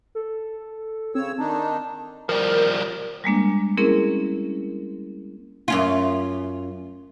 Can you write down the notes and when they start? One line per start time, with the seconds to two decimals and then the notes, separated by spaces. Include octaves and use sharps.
0.15 A4
1.15 C#3 C4 C#5 E6
1.39 D#3 D4 D#4 A5
2.29 F3 G3 A#4
3.24 G3 G#3 A#3 D4
3.78 A#3 C4 C#4 E4 G#4 A#4
5.68 F#2 C#4 F4